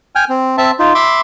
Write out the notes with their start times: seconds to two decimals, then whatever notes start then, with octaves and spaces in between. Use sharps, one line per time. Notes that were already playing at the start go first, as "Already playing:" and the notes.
0.15 G5 G#5 F6
0.29 C4
0.58 C4 E5 A5
0.79 D#4 F4
0.95 E5 B5 C6 D6